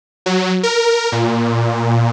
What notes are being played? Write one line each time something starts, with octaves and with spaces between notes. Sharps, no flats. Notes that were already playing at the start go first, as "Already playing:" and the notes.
F#3
A#4
A#2